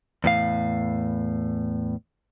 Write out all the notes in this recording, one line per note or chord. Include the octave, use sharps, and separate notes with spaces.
E2 A2 F5